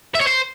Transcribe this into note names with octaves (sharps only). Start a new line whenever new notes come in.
E5
C#5
C5